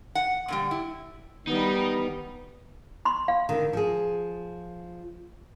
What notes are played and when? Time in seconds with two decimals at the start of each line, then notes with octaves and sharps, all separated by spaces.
0.15 F#5
0.48 A#2 D3 G3
0.71 E4
1.47 D#3 G3 B3 D#4
3.05 B5 C6
3.28 F5
3.49 D3 D#3
3.73 F3 G#4